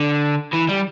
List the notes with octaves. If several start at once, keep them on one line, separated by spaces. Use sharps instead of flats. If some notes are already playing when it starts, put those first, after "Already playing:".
Already playing: D3
E3
G3